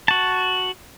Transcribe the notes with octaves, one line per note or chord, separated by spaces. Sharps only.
F#4 A5